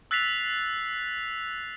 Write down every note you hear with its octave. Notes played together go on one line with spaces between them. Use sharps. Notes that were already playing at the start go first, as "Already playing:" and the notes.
E6 F#6 A6 B6 C7 F7